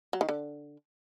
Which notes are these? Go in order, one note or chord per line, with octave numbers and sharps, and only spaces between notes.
F#3
D#3
D3